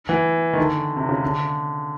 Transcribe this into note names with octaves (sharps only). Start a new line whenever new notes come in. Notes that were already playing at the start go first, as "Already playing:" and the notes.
E3
D#3
D3
C3
C#3
D3